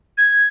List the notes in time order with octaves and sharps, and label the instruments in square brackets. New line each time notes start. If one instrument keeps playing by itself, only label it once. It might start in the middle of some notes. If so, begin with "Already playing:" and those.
[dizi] G#6